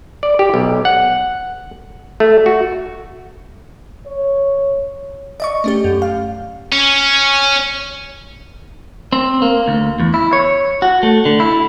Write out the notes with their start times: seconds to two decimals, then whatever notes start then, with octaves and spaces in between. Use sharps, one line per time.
0.23 D5
0.39 G4
0.54 B1
0.85 F#5
2.20 A3
2.46 F#4
4.07 C#5
5.40 D5 D#5 C#6
5.64 A3 C#4 G4
5.84 F#2
6.02 F5
6.73 C#4
9.13 C4
9.42 A#3
9.68 D2
10.00 E2
10.14 E4
10.33 C#5
10.82 F#4
11.03 A3
11.25 D3
11.40 E4